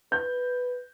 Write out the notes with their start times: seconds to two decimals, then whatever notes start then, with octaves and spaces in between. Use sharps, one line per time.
0.12 B4 G6